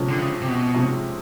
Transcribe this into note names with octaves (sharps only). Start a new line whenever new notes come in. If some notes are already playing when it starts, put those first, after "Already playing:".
Already playing: C3 F3 G#3 C#4
D3
C#3
C3
B2
C3 F3 G#3 C#4